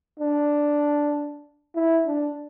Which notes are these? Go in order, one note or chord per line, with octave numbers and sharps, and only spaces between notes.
D4
E4
D4